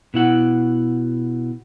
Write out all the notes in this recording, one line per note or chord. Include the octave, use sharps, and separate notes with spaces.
B2 E4 F#5